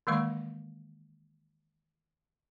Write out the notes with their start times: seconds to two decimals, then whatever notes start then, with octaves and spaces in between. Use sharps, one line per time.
0.07 D#3 E3 G#3 A#3 F5 C#6